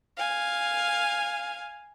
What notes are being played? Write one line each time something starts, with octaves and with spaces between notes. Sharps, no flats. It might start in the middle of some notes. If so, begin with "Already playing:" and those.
F5 G#5